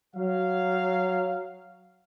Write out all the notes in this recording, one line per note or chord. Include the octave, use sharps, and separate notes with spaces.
F#3 F5